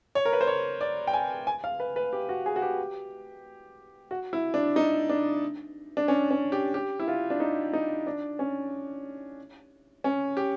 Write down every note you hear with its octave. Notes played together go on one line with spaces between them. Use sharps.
C#5
A#4
B4
C5
C#5
D5
G5
G#5
G#5
F5
B4
B4
G4
F#4
G#4
F#4
G4
F#4
E4
D4
D#4
D4
D4
C#4
C#4
G4
G4
E4
F4
D4
D#4
D#4
D4
C#4
C#4
G4